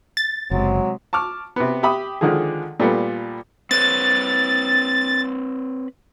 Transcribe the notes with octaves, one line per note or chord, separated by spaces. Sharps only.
A6
F#1 C3 F#3 G#3
A5 C#6 D6 F6
C3 B3
G4 E5 B5 D#6
D3 D#3 F3 G#3 G#4
A#2 G3 A3 B3
C4 B4 C#5 A6